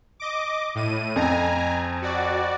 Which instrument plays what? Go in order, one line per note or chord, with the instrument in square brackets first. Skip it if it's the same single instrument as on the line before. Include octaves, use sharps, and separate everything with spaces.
[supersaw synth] D#5 D6
A2 D#7
[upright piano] F2 [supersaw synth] G#5 A#5
[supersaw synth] F#4 D5